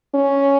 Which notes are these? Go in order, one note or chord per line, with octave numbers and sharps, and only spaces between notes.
C#4